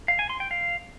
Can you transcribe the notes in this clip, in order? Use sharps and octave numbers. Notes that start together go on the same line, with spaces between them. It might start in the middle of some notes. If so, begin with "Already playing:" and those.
F5
G#5
C6
G5
F5